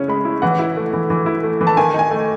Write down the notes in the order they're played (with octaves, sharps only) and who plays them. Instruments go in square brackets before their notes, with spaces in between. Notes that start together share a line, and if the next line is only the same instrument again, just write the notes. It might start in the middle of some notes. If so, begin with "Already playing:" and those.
Already playing: [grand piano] C#3 C#4 E4 C#6
G#3 B5
E4
E3 F#5
E4
A3
E3
E3
E4
A3
E3
A5
D#3 G#5
D#4 G#5
A3